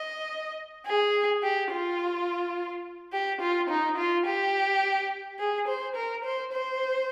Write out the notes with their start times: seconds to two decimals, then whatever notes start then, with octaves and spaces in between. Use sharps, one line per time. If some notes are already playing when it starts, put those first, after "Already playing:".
Already playing: D#5
0.86 G#4
1.43 G4
1.71 F4
3.13 G4
3.41 F4
3.69 D#4
3.97 F4
4.26 G4
5.39 G#4
5.68 C5
5.96 A#4
6.24 C5
6.53 C5